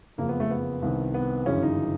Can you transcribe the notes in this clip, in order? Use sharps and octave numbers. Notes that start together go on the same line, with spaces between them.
F#1 F2 C#3 A#3
B3
A3
B3
C2 C3 D#3
B3
G1 F#2 C#3 E3 C#4
D#4